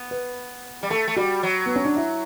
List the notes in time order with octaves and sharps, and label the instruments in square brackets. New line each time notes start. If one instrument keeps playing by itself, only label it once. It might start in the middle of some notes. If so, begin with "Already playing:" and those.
Already playing: [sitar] B3
[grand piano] B4
[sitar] G3
[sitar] A3 [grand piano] A4
[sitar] A3
[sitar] G3 [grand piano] F#4
[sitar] F#3
[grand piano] B3
C#4
D4
E4